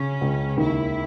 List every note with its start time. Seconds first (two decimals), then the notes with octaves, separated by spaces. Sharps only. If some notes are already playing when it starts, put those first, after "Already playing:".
Already playing: C#3 C#4
0.21 C#2
0.57 D#2 E4